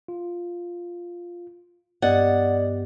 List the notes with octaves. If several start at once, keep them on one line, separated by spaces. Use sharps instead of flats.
F4
G2 B3 G4 D5 D#5 F#5 A6